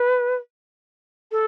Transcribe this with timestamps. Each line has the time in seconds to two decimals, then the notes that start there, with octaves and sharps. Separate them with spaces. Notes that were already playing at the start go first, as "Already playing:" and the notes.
Already playing: B4
1.32 A4